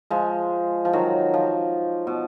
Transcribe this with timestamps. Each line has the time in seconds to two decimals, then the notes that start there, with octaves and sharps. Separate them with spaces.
0.10 F3 G#3
0.85 F3
0.93 D#3 F#3
1.34 F3
2.07 B2